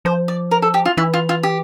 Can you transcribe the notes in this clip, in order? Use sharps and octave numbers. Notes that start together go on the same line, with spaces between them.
F3 C5
D5
A#4
A4
G4
F4
E3 E4
F4
F4
G4